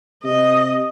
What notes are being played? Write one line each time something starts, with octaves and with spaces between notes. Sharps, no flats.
C3 D#5